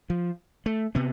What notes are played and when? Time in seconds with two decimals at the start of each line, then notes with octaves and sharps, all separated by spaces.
0.10 F3
0.66 A3
0.95 C3 B3